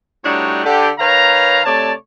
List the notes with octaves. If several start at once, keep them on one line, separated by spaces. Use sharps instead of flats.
A2 G3 D4 D#4 F#4 C#5
D3 G4
D#3 B4 C#5 F5 A#5
C3 A3 C#5 D5 A5